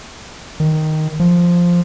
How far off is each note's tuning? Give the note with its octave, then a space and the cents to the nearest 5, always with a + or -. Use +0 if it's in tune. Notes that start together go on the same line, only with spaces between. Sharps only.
D#3 +0
F3 +0